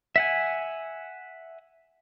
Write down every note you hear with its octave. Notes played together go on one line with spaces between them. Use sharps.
E5 F#5 G#5